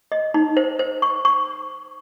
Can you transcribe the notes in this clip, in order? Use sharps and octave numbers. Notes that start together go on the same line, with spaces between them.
D#5
D#4
C5
C5
C#6
C#6